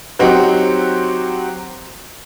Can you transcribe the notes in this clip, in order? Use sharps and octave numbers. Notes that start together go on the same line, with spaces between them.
F#3 C4 D#4 F#4 G4